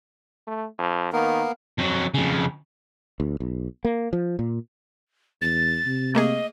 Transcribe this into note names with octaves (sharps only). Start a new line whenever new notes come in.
A3
F2
D#3 A#3 B3 A#4
F2 F#3
F2 C#3
D2
B1
A#3
F3
A#2
E2 A6
C3
A3 A#3 G#4 D#5